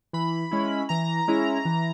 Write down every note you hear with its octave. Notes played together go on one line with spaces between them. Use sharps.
E3 B5
G#3 C#4 E4
E3 A#5
G#3 C#4 E4
E3